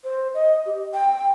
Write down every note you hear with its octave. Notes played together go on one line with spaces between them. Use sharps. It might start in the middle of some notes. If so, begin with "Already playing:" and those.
C5
D#5
G4
G5